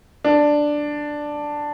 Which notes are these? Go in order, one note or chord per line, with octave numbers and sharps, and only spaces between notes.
D4